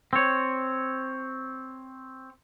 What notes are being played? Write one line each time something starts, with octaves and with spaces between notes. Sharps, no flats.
C4 C#5